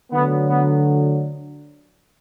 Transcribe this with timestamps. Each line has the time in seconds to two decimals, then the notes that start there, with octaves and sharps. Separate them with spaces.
0.11 D2 D3 F#3 B3
0.49 B3